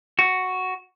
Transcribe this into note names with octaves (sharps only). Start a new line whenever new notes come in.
F#4